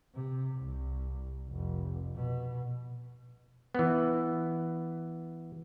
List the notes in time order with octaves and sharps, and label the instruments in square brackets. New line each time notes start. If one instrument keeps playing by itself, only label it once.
[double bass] C3
C2
F1
B2
[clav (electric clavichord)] E3 B3